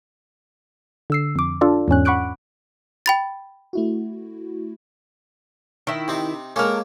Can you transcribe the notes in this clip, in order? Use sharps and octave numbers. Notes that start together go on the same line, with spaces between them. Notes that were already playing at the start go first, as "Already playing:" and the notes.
D3 E6 C7
F2 D6
D4 F4 A4 D5
E2 G#2 C#4 F#6
F#5 B5 C#6 D6 F#6 D7
G5 B5 A6
A3 E4 F#4
D#3 E4
C3 C4 D#4
G#3 A#3 C#4 A4 A#4